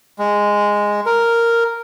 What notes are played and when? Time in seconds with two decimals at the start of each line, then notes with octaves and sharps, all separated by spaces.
0.19 G#3
1.06 A#4